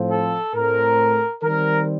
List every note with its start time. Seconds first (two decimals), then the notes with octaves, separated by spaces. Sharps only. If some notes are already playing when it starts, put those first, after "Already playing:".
Already playing: A2 F3 C4
0.11 A4
0.55 A2 A3 C4 A#4
1.42 D#3 G3 C4 A#4